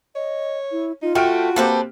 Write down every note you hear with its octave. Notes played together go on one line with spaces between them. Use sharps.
C#5 D#5
E4
D#4 F4
A3 F#4 G5 F6 D7
A#3 C4 G4 A4 B4 C5